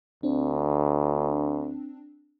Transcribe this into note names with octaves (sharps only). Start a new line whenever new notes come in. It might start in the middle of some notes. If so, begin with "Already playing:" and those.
D2 C4 D4